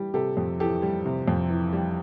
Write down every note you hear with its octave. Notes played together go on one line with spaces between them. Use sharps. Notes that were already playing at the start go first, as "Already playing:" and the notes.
Already playing: E3 G3 G4
C3 G4 A4
F2
E3 G4 A4
G3
C3
F2
E3
G3